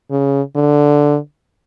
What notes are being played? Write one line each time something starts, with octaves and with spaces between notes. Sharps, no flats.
C#3
D3